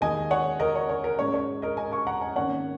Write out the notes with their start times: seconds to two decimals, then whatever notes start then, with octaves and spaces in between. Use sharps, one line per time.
0.01 D#2 D#3 G#3 D#5 G#5
0.31 C#5 F#5
0.60 A#4 D#5
0.75 C#5
0.89 C#5
1.04 A#4
1.19 G#2 G#3 C#4 C#5
1.34 C#5
1.62 A#4 D#5
1.77 D#5 G#5
1.92 G#5 C#6
2.07 F#5 A#5
2.21 D#5 G#5
2.36 G#1 G#2 D#3 A#3 C#4 C#5 F#5